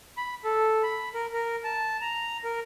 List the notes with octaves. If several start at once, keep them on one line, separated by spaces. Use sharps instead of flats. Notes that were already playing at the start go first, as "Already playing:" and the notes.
B5
A4
B5
A#4
A#4
A5
A#5
A#4